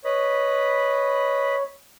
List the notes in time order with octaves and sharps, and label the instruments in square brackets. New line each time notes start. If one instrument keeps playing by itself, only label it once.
[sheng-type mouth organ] B4 D#5 B5 [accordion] C#5